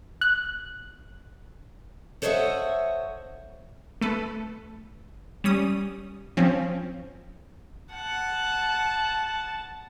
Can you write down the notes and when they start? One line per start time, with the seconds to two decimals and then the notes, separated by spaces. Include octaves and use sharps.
0.21 F#6
2.22 A4 C5 C#5 D#5 E5 F#5
4.01 A3 A4 B4
5.44 G3 C#4 D#6
6.37 F3 C4 C#4
7.93 F#5 A5